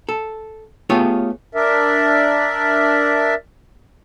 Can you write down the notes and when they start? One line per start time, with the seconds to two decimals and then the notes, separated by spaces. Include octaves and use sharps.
0.09 A4
0.90 A3 B3 F4 G4 G#4 C#5
1.55 D4 A#4 D5 E5